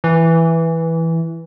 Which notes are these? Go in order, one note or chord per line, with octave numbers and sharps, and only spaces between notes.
E3